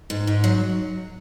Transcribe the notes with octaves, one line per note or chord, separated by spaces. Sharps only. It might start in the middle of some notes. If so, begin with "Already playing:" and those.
G#2
G#2
F#3